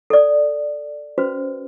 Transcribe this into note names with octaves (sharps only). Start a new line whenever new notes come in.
A4 D5
C#4 F#4 B4 C5